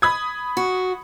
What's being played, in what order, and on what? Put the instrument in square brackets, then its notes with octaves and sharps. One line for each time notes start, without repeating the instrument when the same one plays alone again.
[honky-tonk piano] B5 D#6 G#6
[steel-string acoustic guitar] F#4